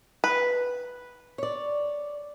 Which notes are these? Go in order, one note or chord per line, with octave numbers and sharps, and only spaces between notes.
B4
C#5 D5